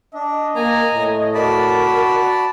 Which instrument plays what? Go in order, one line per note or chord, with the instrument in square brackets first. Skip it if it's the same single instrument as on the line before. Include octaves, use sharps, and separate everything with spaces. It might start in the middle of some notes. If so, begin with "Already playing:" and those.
[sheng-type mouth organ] D4 [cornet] D#5
[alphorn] A#3 [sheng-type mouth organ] G#5 A#5
[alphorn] A2
[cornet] F#4 [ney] A#4 [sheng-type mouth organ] D5 A5 B5